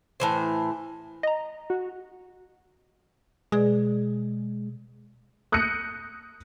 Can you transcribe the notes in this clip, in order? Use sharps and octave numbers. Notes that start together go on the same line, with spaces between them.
A2 E3 C5
D#5 A#5
F#4
B2 G#3 G#4 D5
D#6 F#6 G6 A#6 C#7 D#7